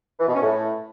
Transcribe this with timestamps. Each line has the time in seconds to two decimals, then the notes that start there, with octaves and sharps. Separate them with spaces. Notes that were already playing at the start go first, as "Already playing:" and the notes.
0.20 E3
0.27 B2
0.35 C#4
0.43 A2